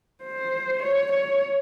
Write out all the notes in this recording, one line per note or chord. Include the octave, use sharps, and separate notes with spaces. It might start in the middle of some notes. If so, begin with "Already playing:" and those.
C5
C#5
C#5